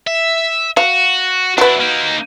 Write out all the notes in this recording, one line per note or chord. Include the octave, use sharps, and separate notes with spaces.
E5
F#4 F5
D4 E4 F#4 B4
A#3 D#4